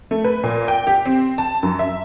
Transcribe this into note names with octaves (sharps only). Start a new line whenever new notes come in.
A3
B4
A#2
G5
G4
C4
A5
F#2
E5